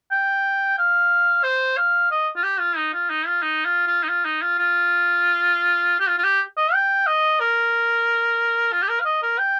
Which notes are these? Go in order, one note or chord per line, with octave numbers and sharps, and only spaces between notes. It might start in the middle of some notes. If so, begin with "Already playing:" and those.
G5
F5
C5
F5
D#5
F4
G4
F4
D#4
F4
D#4
F4
D#4
F4
F4
D#4
F4
D#4
F4
F4
G4
F4
F4
G4
D#5
G5
D#5
A#4
F4
G4
A#4
F5
D#5
A#4
G5